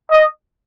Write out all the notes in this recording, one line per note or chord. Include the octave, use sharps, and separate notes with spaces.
D#5